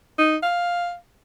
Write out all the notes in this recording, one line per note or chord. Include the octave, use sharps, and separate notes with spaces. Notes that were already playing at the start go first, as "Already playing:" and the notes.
D#4
F5